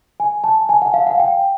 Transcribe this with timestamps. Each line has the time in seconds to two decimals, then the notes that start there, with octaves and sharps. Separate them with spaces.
0.20 G#5
0.44 A5
0.69 G#5
0.82 F#5
0.94 F5
1.07 F#5
1.20 G5